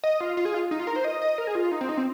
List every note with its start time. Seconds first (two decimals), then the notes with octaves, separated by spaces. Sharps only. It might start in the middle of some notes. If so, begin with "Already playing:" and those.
0.04 D#5
0.21 F4
0.37 F4
0.45 G#4
0.54 F4
0.71 D#4
0.80 F4
0.87 A#4
0.96 C5
1.04 D#5
1.22 D#5
1.38 A#4
1.47 G#4
1.55 F4
1.71 D#4
1.81 C4
1.89 D#4
1.97 C4